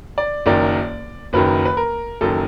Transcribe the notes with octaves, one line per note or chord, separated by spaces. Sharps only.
D5
F#1 F#2 D#3 D5
F#1 F#2 D#3 B4
B4
A#4
F#1 F#2 D#3 A4